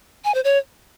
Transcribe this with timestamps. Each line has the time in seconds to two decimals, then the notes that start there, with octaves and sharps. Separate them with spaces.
0.25 G#5
0.34 C5
0.44 C#5